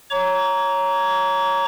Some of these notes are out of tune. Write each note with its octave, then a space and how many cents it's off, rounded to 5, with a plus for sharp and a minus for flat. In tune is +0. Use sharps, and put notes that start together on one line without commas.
C#5 +0 A#5 +0 D6 -45